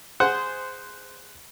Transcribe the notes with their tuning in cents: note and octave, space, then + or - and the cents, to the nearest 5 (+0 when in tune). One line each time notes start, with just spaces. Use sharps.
G#4 -5 C5 -15 F#5 +0